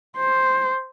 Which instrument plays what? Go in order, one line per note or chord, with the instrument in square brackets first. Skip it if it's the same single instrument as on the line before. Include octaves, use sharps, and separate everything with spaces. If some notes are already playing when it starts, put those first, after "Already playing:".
[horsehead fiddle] C5